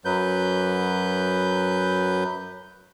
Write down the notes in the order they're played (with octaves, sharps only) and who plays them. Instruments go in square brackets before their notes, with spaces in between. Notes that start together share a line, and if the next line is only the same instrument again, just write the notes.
[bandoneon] F#2 F#3 B4 G6